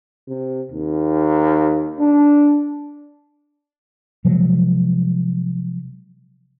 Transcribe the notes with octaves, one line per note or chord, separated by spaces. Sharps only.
C3
D#2
D4
C3 F3 F#3 G#3